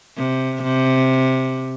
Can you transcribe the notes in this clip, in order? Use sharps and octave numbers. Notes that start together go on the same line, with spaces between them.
C3
C3